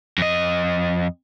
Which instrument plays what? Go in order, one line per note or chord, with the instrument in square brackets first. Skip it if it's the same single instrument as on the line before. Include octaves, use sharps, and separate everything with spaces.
[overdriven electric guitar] F2 D#5